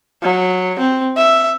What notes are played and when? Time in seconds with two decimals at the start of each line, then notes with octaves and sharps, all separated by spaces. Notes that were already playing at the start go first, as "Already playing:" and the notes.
0.23 F#3
0.79 C4
1.16 E5